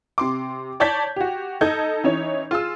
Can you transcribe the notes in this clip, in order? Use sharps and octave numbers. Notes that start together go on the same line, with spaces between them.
C3 C6 D6
C#5 D5 A5 G6 G#6 B6
F#4 G4
D#4 A4 D#5 G6 G#6
E3 C#4 D#4 C#5
F4 G#4 E6